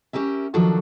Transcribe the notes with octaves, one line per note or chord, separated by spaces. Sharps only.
C#4 D#4 G4 A#4 E5
D#3 F3 F#3 D4 F#4 A4